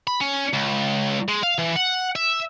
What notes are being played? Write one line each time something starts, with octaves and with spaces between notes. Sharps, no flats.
B5
C#4
C#2
G#3
F5
E3
F#5
E5